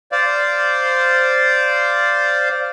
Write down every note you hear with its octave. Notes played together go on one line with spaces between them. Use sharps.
C5 D5 F5